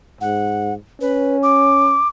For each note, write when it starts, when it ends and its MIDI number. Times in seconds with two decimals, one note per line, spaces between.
0.21 0.76 44
0.21 0.74 78
1.01 1.99 61
1.01 1.37 71
1.43 2.08 86